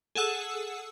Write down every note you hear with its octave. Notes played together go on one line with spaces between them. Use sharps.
G#4 A4 F#5 E6